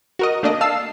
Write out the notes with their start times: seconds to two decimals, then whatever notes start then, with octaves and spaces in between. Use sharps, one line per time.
0.19 F#4 A#4 D#5
0.43 A3 A#3 D4 D5 D#5
0.61 F5 A5 E6 C7